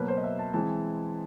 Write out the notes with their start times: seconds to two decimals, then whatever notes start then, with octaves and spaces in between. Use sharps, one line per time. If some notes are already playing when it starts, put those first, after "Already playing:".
Already playing: B2 F#3 A#3 B4
0.08 C5
0.17 D#5
0.24 E5
0.39 A5
0.53 E3 G#3 C4 A5